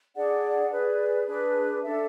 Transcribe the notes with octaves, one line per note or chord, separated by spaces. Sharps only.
D4 G#4 D5 F#5
G#4 B4 D5
D4 G#4 B4
D4 A4 E5